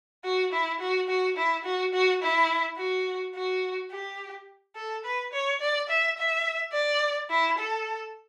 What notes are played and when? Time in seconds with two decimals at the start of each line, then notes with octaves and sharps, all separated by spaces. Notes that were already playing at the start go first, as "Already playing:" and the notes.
0.24 F#4
0.53 E4
0.80 F#4
1.09 F#4
1.37 E4
1.65 F#4
1.93 F#4
2.22 E4
2.78 F#4
3.35 F#4
3.91 G4
4.76 A4
5.05 B4
5.33 C#5
5.61 D5
5.89 E5
6.17 E5
6.73 D5
7.30 E4
7.58 A4